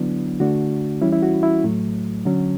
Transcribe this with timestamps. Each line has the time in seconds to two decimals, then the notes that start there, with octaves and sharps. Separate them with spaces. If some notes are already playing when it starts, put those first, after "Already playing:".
Already playing: D3 F#3 B3 D4 E4
0.40 D3 A3 D4 F#4
1.01 E3 G3 C#4 E4
1.13 E4
1.23 F#4
1.43 E4
1.64 A2 F#3 A3
2.25 D3 F#3 C#4